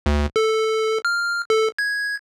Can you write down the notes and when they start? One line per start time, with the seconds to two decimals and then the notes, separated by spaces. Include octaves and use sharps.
0.06 D2
0.36 A4
1.05 F6
1.50 A4
1.79 G#6